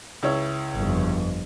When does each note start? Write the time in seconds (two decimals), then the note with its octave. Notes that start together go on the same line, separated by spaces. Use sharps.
0.23 C#2 E4 C#5
0.75 G1 F2